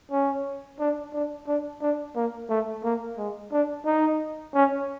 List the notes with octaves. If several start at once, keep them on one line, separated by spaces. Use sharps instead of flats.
C#4
D4
D4
D4
D4
A#3
A3
A#3
G#3
D4
D#4
C#4